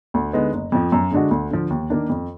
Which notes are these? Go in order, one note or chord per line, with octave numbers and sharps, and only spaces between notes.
D2
D3 G#3 B3 D#4
F#1
F2 F3
F#2
D3 G#3 D4 F#4
D2
D3 F3
D#2
D#3 A#3 D4
F2